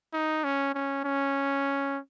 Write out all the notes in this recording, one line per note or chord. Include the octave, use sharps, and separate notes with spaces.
D#4
C#4
C#4
C#4